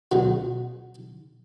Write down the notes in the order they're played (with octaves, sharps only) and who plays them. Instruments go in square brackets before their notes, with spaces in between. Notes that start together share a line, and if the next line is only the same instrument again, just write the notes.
[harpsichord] C#2 B2 F#3